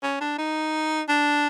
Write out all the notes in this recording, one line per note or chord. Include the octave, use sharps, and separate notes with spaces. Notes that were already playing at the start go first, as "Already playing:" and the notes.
C#4
D4
D#4
D4